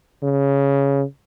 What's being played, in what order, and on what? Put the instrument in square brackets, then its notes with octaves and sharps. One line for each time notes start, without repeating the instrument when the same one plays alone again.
[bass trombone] C#3